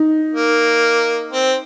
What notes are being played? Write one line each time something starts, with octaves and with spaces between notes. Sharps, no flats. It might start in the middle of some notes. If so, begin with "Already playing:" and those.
Already playing: D#4
A#3
C4